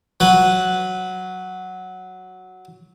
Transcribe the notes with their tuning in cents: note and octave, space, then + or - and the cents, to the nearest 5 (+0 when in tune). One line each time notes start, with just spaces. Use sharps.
F#3 +0 B4 +0